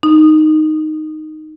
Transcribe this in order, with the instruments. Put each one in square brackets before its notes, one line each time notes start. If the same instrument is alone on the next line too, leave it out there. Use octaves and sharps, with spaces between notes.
[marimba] D#4